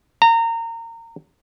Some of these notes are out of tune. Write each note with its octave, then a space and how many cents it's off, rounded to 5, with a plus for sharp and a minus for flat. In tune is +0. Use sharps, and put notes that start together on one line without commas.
A#5 -25